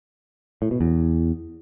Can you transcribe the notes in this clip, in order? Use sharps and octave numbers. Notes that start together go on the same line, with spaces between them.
A2
B2
E2